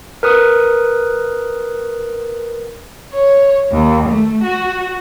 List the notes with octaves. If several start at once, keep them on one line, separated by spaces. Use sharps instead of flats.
A#4 B4 D#6
C#5
D#2
A3
F#4